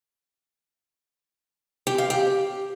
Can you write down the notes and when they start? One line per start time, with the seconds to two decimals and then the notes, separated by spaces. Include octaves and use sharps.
1.87 G4
1.98 F5
2.10 G4